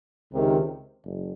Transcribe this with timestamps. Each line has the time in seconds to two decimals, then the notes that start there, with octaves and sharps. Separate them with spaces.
0.33 C#2 C3 D#3
1.05 F#1